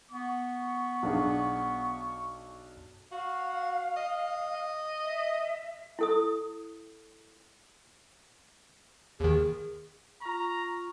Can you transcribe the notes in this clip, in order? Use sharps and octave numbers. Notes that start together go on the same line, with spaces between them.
B3 C#6
B1 D4 G#4
F#4 F5
D#5
E5
E4 A4 D#6
D#2 D#3 G#4
F4 A#5 C#6